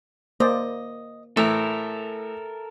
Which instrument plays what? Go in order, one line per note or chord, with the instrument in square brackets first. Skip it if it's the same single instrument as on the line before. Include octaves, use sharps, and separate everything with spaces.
[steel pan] A#3 C5 D5 [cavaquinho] D#5
[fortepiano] A2 E3 [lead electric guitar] A4 A#4 [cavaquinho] E5